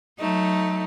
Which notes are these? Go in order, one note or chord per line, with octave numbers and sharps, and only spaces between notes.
F#3 A3 D#4